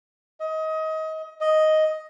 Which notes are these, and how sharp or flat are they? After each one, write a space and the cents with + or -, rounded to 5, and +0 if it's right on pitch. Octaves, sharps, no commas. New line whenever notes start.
D#5 +25
D#5 +5